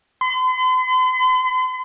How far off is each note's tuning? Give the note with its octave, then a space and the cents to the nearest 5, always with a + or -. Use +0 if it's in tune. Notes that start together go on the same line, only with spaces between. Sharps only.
C6 -45